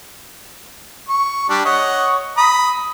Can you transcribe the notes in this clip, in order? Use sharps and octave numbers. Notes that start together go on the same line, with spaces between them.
C#6
G3 D4
C#5 D#5 F#5
A#5 B5 D#6